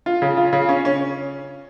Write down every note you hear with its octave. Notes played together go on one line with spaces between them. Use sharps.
F4
C#3
F4
C#3
C#4
C#4